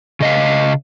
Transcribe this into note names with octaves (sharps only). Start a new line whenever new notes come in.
C#3 D#5 F5